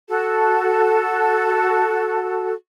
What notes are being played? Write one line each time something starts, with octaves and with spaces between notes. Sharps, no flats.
F#4 A4